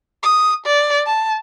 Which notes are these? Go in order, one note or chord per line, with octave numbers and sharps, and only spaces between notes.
D#6
D5
A5